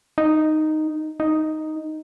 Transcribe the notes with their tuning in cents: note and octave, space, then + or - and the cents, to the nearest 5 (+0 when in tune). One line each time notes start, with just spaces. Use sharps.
D#4 -5
D#4 +0